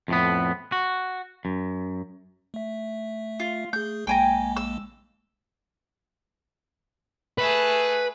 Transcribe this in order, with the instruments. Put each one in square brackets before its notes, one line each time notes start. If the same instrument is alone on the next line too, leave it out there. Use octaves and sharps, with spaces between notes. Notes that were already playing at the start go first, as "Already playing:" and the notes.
[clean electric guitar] F2 A2 B3
F#4
F#2
[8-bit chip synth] A3 E5
[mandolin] F4
[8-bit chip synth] A3 G#4 [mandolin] G6
[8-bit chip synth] A#1 G#3 A#3 [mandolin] G5 G#5 A#5
[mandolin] E6
[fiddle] A3 G#4 [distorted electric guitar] B4